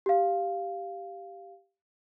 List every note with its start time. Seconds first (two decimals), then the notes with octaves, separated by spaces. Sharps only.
0.06 G4 F5